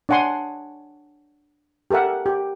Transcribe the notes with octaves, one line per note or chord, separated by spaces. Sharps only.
D4 C#5 F#5 G#5 C6
G4 A4 A#4 E5 F#5
G4